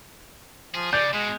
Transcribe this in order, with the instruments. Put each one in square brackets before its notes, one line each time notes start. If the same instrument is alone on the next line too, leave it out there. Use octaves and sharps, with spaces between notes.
[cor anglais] F3 [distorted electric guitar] G#4
[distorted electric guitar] C#3 [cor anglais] D5 [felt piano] G6
[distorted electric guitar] B2 [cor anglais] G#3